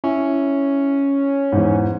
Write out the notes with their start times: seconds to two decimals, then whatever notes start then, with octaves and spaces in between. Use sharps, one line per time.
0.04 C#4 E4
1.52 E2 G#2